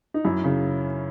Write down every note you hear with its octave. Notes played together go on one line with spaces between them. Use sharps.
D#4
F#2 E4
C#3